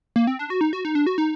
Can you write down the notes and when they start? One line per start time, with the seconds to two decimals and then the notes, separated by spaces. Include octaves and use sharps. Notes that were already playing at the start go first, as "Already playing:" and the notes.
0.16 A#3
0.27 C4
0.39 D4
0.50 F#4
0.61 D#4
0.73 F#4
0.85 D#4
0.95 D4
1.07 F#4
1.18 D#4